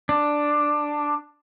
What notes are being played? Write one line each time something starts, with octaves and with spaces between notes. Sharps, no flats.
D4